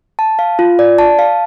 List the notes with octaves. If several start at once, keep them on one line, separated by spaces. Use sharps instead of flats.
A5
F5
F4
D5
A5
F5